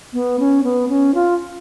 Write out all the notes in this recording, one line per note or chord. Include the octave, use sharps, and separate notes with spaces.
B3
C#4
B3
C#4
F4